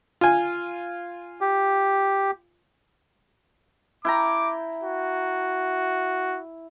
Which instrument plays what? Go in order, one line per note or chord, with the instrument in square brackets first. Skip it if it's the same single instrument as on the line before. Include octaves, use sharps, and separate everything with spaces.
[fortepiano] F4 G#5
[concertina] G4
[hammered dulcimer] E4 G5 A#5 [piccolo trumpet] D6
[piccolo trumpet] F#4